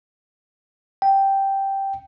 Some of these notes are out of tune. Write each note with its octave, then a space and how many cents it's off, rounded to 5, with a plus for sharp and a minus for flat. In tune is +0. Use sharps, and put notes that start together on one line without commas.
G5 -5